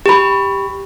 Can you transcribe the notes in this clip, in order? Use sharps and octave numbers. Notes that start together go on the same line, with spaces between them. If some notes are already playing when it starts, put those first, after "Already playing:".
G4 B5